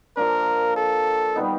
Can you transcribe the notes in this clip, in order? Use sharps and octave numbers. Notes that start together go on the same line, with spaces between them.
F3 A#3 D4 A#4
A4
D#3 G3 B3 D#4